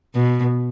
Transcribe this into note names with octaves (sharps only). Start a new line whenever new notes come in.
B2